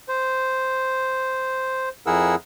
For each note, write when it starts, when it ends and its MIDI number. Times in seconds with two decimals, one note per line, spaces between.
0.08 1.89 72
2.06 2.35 41
2.06 2.35 64
2.06 2.35 68
2.06 2.35 70
2.06 2.35 78
2.06 2.35 88